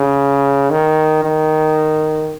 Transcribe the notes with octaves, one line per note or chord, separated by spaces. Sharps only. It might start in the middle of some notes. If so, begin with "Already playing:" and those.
Already playing: C#3
D#3
D#3